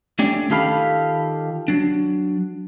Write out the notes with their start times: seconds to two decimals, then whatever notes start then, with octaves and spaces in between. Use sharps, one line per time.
0.19 A3 C#4 D4 G4
0.50 D#3 F4 G4 A4 F5 B5
1.68 F#3 D4